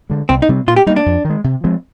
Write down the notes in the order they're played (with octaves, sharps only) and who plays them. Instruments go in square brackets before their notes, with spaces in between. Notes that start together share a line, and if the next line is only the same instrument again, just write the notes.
[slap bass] D3 G#3
[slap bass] C2 [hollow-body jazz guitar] C4
[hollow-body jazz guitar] D#4
[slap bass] C3 G3 C4
[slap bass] A#2 [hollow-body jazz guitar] F4
[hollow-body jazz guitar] G4
[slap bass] G3 [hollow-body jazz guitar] D#4
[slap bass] A#3
[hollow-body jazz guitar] D4
[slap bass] F2
D#3
G#3
C3
F3 G#3 C4